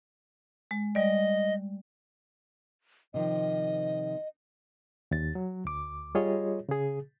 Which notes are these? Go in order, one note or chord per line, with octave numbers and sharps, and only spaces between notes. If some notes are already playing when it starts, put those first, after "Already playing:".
G#3
G3 D5 D#5
C3 D#3 F3 D#5
D#2 A6
F#3
D2 D6
G3 F4 G#4 C#5 D#5
C#3 G#4